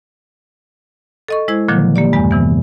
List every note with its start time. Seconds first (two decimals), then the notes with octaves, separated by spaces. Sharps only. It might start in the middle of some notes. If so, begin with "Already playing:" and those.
1.28 A4 D#5 C#6
1.48 G#3 E4 C5 G#6
1.68 A#2 D3 D#3 F3 F#3 A#3
1.96 A#3 G4 D5
2.13 E2 G2 G#3 G#5
2.31 C3 E3 B3